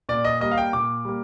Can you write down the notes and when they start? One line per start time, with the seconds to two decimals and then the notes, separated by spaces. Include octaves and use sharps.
0.09 A#2 D5
0.25 D#5
0.40 G3 A#3 D#5
0.51 F5
0.58 G5
0.73 A#2 D6
1.05 G3 A#3